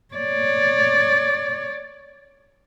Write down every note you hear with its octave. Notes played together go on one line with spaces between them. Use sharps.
C#5 D5